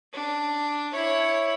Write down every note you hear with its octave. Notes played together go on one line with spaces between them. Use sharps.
D4
E4 C#5